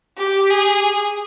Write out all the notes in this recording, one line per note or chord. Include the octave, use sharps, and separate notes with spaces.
G4
G#4